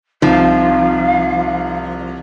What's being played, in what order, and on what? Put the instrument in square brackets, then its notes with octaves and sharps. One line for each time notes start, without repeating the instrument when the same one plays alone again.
[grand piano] C2 [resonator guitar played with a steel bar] F3 [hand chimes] D#4 [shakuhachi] F5